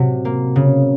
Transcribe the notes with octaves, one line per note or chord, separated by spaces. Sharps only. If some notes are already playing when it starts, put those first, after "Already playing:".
Already playing: A2 C3 F#3
A#3
C#3